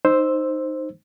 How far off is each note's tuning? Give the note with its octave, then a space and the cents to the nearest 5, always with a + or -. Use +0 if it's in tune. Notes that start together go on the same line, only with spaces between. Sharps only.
D#4 -10 C5 +0 E6 +0